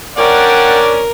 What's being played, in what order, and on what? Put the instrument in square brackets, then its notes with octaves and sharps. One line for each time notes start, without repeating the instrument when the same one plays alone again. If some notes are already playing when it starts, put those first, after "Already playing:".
[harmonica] C#4 D4 D5 [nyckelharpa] A#4 [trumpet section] F#5 G5